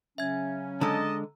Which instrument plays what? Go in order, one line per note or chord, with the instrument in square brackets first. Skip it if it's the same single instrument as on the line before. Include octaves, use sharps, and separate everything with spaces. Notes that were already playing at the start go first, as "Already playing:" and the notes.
[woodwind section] C#3 F#3 C#4 [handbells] E5 G#6
[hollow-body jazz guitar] D3 G#3 [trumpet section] D#5 A5 [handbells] A#5 E6